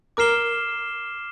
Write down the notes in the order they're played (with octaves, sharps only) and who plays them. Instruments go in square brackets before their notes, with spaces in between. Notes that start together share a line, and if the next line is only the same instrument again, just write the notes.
[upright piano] A#4 [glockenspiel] D6 F6 C7 E7 G7